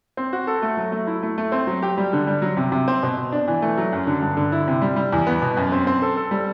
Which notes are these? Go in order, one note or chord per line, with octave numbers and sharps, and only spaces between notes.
C4
F#4
A4
A3
F#3
A3
E4
A3
A3
C4
F#3
G4
G3
D3
G3
F#3
C3
C3
C4
B2
B2
D4
E3
A3
F#3
F#2
D3
G2
D3
E4
C3
G3
G3
E2
B3
B2
F#2
C4
C4
A4
A4
G3